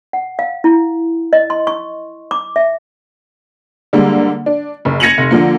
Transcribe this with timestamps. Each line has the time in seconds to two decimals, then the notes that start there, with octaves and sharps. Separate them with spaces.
0.13 F#5
0.39 F5
0.64 E4
1.33 D#5
1.50 C6
1.67 C#6
2.31 D6
2.56 E5
3.93 D3 G3 G#3 A#3
4.46 D4
4.85 F#1
5.00 G#6 A#6 C#7 D#7 F7 F#7
5.18 F1
5.31 D3 F3 A#3